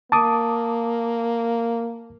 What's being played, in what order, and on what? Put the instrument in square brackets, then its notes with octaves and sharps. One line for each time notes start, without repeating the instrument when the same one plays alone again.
[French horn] A#3 [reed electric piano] A5 D6 D#6